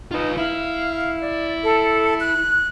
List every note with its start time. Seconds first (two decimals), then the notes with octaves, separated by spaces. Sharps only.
0.12 D#4 F4 B4
0.37 E4 F5
1.21 D5
1.64 A4
2.20 F#6